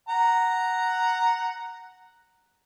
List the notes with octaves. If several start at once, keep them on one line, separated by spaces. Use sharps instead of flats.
F#5 A#5